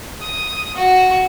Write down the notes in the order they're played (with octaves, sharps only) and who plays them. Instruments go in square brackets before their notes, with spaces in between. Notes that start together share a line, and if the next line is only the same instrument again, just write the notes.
[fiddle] D#6
F#4